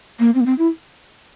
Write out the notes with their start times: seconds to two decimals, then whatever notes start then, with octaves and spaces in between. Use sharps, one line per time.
0.19 A#3
0.35 C4
0.41 A#3
0.46 C4
0.58 E4